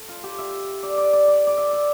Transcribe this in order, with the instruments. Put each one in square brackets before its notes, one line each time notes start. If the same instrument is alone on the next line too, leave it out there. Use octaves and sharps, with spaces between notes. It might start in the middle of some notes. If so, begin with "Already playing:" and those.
Already playing: [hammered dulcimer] A4
F4
G4
E5
D5
D5
D5
D5
D5
E5
D5